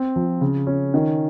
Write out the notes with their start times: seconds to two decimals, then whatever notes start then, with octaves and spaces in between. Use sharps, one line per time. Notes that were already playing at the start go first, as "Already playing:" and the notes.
Already playing: C4
0.16 F3
0.41 C#3
0.67 C#4
0.94 D#3